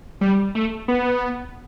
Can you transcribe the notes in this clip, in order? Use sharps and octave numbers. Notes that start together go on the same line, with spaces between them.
G3
A3
B3